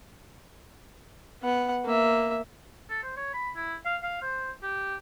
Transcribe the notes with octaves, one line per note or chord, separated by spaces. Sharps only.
B3 F#5
A#3 E5
A4
C5
C#5
B5
E4
F5
F5
C5
G4